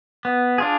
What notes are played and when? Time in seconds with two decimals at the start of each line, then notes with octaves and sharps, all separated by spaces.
0.25 B3
0.58 D4 F4 G#4